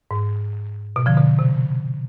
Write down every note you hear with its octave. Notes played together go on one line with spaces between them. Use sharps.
G#2
B2
D3 F3
B2 D3
C3